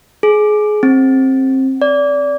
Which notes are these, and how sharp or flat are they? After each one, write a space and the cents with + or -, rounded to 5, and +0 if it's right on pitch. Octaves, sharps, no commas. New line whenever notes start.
G#4 +25
C4 +20
D5 -25